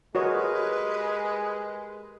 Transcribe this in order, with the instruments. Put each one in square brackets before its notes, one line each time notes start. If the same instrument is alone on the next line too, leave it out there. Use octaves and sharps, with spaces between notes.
[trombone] G#3 [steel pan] F#4 C#5 D#5 [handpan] G4 A#4 [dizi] B4